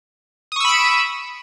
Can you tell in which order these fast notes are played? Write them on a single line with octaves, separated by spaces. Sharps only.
D#6 C#6 E6 B5 D7